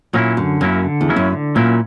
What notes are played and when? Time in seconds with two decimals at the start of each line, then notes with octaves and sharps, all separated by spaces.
0.13 A#2 F#3 A#3 C#4 E4
0.37 F#2 D3
0.61 F#2 F#3 A#3 C#4 E4
0.84 D3
1.01 E2
1.09 F#3 A#3 C#4 E4
1.16 F#2
1.32 D3
1.55 A#2 F#3 A#3 C#4 E4